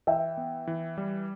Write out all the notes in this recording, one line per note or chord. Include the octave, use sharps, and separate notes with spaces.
E3 E5 G5
B3
E3
G3